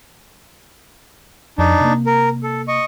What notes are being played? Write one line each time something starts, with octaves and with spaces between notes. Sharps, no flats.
F2 D4 D#4
C3 A#3
A#4
A4
D#5 C#6